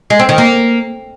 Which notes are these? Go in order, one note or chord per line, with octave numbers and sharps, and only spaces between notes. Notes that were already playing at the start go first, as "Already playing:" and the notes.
G#3
C4
D#3
A#3